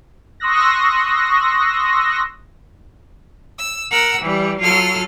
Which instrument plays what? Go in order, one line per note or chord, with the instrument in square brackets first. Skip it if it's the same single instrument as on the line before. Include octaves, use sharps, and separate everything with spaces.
[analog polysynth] C6 C#6 D#6 E6 F#6 A#6
[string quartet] E6
A#4 F#5 E6
E3 G3
F#3 F4 A4 F6